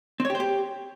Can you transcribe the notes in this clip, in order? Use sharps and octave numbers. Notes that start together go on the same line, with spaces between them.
C4
C#5
G4
C5
G4